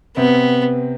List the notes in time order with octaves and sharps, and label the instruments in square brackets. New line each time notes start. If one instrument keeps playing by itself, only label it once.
[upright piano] C3 C4 [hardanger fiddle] B3